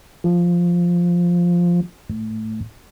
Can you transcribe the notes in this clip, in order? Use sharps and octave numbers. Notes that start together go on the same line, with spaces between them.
F3
A2